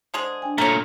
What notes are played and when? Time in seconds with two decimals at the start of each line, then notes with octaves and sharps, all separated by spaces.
0.14 D3 G#3 G#4 C5 C6
0.42 D4 G5 G#5
0.58 A#2 A3 C#4 A#4